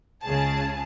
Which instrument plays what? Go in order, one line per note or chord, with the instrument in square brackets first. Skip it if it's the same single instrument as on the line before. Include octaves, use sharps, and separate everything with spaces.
[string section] C#2 C#3 G#4 A5